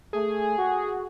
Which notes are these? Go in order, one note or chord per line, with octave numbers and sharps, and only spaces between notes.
A3 G#4
F#4